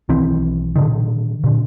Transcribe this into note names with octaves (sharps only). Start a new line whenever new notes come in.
B1 D#3 E3 C4
A#2 D3 D#3
A#2 D3